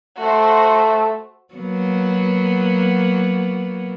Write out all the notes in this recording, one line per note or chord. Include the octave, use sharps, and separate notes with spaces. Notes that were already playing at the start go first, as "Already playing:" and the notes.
A3 F#4 C5
F#3 A#3 B3